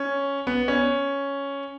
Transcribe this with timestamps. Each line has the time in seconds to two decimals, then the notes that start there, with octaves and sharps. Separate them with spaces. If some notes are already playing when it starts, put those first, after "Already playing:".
Already playing: C#4
0.47 B3
0.68 C#4